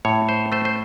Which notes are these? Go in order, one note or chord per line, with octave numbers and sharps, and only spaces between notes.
A2 C#5
C5
A3 C5
C5